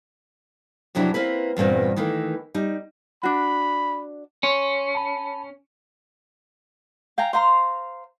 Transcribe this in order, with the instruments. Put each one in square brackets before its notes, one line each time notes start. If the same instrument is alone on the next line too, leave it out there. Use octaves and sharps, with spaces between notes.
[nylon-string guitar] F2 C3 F#3 D4 E4
A#3 C4 E4 B4
E2 G2 A#2 C4
D#3 E3 A3 A#3
G3 D#4
[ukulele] D4 F#4 [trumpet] B5
[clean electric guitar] C#4 [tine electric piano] C#5 C6 C#6
[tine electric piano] A5 B5
[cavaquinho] F5 G5 G#5 A#5
C5 F5 A#5 C6